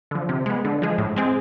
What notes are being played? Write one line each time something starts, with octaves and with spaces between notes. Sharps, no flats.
D3 F3
C3
G#3 B3
D3
F3 G#3
A2
G#3 C4 G#4